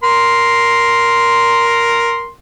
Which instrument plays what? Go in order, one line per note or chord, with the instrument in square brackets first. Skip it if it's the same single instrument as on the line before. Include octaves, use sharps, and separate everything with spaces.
[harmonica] A#4 C6